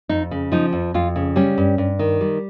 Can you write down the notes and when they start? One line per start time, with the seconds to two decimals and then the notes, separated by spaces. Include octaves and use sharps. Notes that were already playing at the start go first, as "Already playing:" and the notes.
0.09 F2 D#4
0.31 C#3
0.52 F3 D#4
0.73 F2
0.94 F2 F4
1.16 C#3
1.36 G3 C#4
1.58 G2
1.78 G2
1.99 D#3
2.20 G3